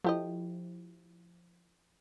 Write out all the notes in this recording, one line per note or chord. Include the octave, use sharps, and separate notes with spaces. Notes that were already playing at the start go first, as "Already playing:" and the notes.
F3 A3 E4 G4 D#5